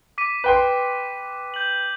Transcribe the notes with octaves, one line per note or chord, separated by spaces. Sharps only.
D6 B6 D#7
B4 G5 C6
G6 F#7